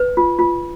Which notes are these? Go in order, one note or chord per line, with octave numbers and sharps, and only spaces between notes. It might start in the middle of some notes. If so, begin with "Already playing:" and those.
Already playing: B4
F4
F4